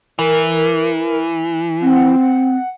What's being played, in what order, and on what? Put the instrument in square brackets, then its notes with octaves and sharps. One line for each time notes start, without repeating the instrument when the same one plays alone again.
[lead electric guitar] E3 [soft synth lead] A#4
[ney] C4 [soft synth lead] F#5